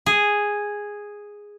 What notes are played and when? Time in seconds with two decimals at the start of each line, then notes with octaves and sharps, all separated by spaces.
0.06 G#4